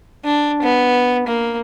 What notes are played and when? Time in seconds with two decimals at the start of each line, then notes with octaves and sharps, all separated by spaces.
0.24 D4
0.62 B3
1.27 A#3